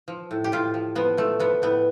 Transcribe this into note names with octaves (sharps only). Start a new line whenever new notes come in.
F3
A2
G4
A2 F4
F3
F3 B3
F3 A3
F3 B3
A2 B3